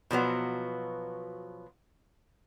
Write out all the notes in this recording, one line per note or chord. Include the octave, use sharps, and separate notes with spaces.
B2 F3 F#3 B3